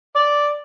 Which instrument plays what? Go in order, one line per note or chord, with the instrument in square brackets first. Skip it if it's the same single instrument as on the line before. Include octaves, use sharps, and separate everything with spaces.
[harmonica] D5